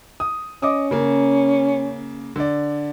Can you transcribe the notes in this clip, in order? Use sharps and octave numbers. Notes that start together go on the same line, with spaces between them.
D#6
C#4 D#5 D6 D#6
C#3 A#3
D3 D5